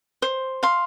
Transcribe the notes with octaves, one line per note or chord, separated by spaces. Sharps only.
C5
F5 C6